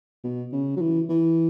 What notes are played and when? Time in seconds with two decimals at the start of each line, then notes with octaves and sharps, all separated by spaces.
0.24 B2
0.53 C#3
0.76 F#3
0.81 E3
1.09 E3